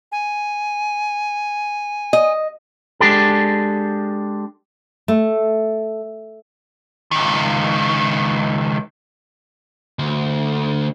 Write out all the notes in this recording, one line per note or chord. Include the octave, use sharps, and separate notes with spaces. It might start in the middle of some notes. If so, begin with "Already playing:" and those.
G#5
D#5
G#3 D4 G4 A4
A3
C#2 D#3
D2